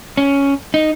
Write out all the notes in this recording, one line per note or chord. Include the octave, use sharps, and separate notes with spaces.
C#4
D#4